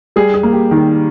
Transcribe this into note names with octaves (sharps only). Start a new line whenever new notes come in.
G3 G#4
G#4
A#3
G4
D#3